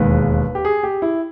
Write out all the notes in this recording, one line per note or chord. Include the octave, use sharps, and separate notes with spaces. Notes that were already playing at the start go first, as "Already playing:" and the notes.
Already playing: E1 D#2 D#3 G#3 B3 B4
G4
G#4
G4
E4